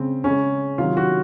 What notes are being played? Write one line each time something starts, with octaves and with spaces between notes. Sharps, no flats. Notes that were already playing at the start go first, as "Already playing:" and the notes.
Already playing: C#3 G#3 C4
C#3 G#3 C#4
C3 D#3 F#3 F4
F#4